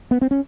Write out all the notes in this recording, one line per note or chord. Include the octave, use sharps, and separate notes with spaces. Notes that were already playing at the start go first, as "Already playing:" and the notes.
B3
C4
C#4